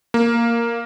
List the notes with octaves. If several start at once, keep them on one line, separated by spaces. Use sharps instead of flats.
A#3